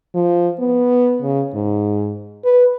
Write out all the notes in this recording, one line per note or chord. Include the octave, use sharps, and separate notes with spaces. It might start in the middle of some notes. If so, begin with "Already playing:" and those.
F3
B3
C#3
G#2
B4